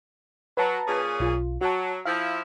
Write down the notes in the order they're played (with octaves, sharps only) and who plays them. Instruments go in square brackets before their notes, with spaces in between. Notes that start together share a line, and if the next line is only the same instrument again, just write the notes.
[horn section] F#3 [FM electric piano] B4 A5 A#5
[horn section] A#2 C#4 G#4
[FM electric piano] B1 F4
[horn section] F#3 [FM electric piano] F#4 A5
[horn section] F3 E4 [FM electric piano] F5